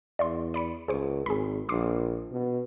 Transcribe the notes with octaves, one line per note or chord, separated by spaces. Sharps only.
E2 D5 E5 C6
D5 B5 C#7
C#2 G#4 C5 C#6
G#1 G#4 B5
A#1 C6 D6 C7
B2